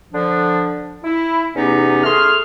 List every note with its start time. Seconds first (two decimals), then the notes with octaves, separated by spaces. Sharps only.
0.13 D3 F3 D4
1.04 E4
1.55 E2 C3 B3 C#4 D#4
2.04 A3 G#4 C6 F6